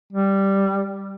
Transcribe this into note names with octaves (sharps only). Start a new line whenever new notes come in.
G3